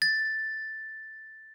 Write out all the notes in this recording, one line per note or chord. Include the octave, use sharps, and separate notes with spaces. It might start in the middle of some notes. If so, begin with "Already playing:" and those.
A6